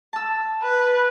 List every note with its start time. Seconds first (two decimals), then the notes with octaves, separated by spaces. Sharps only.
0.13 A5 E6
0.62 B4